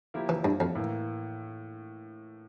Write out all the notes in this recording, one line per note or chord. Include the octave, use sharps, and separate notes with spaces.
F3 A#3 E4 G4 A#4
E3
G2
F2
A2 E3 A#3